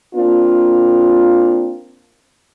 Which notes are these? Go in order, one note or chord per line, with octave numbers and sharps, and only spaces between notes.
A#3 C4 D4 F4